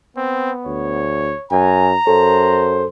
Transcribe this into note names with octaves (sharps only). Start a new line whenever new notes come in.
B3 C4
D2 C#5
F#2 G#5 A#5
F#2 A4 C5